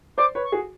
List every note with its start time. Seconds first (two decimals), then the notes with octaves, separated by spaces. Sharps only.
0.17 C5 D5 D6
0.35 B4 C#5
0.44 C#6
0.52 F#4 G#4